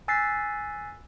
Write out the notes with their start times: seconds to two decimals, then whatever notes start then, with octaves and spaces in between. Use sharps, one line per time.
0.08 G#5 E6 F#6 A6 B6 C7